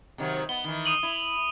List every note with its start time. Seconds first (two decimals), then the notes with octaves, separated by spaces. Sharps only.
0.18 C3 D#3 F#3
0.49 B3 G7
0.64 D#3 E3
0.86 D#6 D#7 F#7
1.03 E4